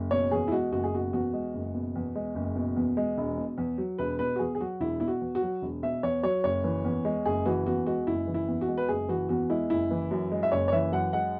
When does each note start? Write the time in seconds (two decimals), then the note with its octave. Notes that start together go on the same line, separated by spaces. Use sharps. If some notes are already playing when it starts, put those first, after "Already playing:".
Already playing: F#1
0.11 B2 C#5
0.31 E2 G#4
0.48 E4
0.52 G#3 F#4
0.72 F#1 F#4
0.84 G#4
0.92 B2 F#4
1.13 E2 F#4
1.33 G#3
1.54 F#1
1.74 B2
1.95 E2
2.15 G#3
2.35 F#1
2.56 B2
2.76 E2
2.97 G#3
3.18 E1
3.38 B2
3.58 E2
3.78 F#3
3.99 E1 B4
4.19 B2 B4
4.36 F#4
4.39 E2 G#4
4.55 G#4
4.60 F#3 F#4
4.80 E1 E4
5.00 B2 E4
5.08 F#4
5.21 E2
5.35 F#4
5.42 F#3
5.62 E1
5.83 B2 E5
6.03 E2 C#5
6.23 F#3 C#5
6.44 F#1 C#5
6.64 E3
6.84 E2
7.05 G#3
7.26 F#1 G#4
7.46 E3 F#4
7.66 E2 F#4
7.86 G#3 F#4
8.07 F#1 E4
8.27 E3
8.34 E4
8.48 E2
8.61 F#4
8.68 G#3
8.78 B4
8.89 F#1 G#4
9.09 E3 F#4
9.29 E2 F#4
9.50 G#3 E4
9.70 F#1 E4
9.91 E3
10.11 F#2
10.32 G#3
10.43 E5
10.52 F#1 C#5
10.68 C#5
10.72 E3 E5
10.92 F#2 F#5
11.13 G#3 F#5